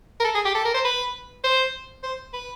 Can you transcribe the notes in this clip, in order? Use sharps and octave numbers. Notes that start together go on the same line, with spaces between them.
A#4
A4
G#4
G4
A4
A#4
C5
B4
C5
C5
B4